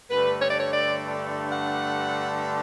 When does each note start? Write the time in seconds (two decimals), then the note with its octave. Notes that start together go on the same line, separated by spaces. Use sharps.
0.10 G2 D3 A3 B4
0.42 C#5
0.51 D5
0.60 C#5
0.73 D5
1.52 F#5